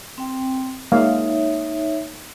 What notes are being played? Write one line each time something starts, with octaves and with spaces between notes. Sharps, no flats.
C4 G5
G#3 A#3 D#4 C#5 E5 F5